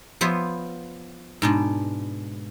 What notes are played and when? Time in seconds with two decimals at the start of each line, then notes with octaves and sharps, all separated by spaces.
0.21 F3 B3 C5 C#5 E5
1.42 G#2 B2 D4